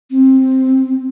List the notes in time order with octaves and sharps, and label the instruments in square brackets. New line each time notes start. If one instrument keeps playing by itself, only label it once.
[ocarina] C4